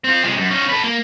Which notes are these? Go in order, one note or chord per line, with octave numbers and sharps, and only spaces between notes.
C4 F4
C3 G#3
F#2
C#4 D#4
A4 B4
A#3